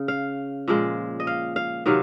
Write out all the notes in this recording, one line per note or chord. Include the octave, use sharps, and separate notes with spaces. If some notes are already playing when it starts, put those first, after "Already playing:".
Already playing: C#3
F5
A#2 F3 G#3
D#5
F5
F5
C3 D#3 F#3 F5